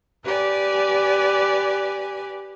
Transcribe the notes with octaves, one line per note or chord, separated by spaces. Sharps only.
G4 B4 D5 G#5